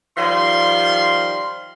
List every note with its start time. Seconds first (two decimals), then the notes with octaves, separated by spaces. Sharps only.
0.17 D#3 F3 G3 C6